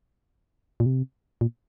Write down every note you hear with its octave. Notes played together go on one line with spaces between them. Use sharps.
A#2
C3
A#2